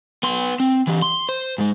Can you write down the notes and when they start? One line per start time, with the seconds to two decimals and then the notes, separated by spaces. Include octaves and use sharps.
0.23 B3 C6
0.60 C4
0.87 E3 G4
1.02 C6
1.29 C5
1.58 G#2 G#3